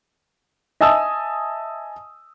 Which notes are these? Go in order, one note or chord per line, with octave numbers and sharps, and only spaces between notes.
D#5 E5 G#5 A5 D#6 E6